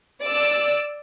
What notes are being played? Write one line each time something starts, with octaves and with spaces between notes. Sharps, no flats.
D5 E6